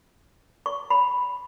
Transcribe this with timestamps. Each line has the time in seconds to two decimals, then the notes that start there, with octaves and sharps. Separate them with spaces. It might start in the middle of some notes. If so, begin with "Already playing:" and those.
0.66 C#6
0.90 B5